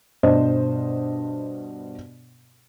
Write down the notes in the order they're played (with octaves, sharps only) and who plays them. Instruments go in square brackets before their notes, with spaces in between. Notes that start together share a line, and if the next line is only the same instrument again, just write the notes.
[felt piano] G2 B2 D4 C5 D#5